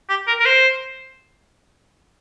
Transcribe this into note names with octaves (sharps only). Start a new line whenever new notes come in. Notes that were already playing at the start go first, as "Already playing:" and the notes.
G4
A#4
A#4
C5